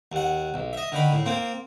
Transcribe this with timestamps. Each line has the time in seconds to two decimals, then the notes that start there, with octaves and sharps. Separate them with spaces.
0.12 D#2 F#5
0.54 B1
0.73 D#5 E5
0.92 D3 D#3 B5
1.12 A2
1.26 A#3 C4